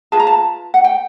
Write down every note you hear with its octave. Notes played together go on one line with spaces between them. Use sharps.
F4 G#4 B4 A5
A#5
A5
F#5
G5